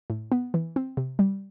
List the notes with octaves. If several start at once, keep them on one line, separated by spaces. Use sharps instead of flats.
A2
B3
E3
C4
C3
G3